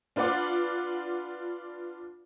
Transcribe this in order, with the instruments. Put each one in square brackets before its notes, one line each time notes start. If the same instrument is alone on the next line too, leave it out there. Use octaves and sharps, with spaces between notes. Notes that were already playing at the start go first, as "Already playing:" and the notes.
[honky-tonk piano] D4 F4 B4 D5 F#5 D6